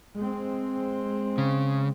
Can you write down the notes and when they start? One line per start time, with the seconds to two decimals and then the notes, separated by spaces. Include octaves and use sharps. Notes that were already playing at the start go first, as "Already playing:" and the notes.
0.18 G#3 C4
1.38 C#3